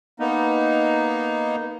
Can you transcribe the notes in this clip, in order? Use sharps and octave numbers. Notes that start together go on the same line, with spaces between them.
A#3 B3 D#4